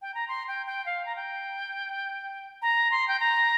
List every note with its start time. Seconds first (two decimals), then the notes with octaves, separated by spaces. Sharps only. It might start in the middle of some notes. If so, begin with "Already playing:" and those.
0.02 G5
0.14 A#5
0.28 C6
0.48 G5
0.66 G5
0.86 F5
1.06 A#5
1.16 G5
2.62 A#5
2.91 C6
3.08 G5
3.20 A#5